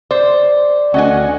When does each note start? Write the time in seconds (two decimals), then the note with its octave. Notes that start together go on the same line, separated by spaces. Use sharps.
0.11 C5 D5
0.94 D2 C#4 D#5 F#5 G#5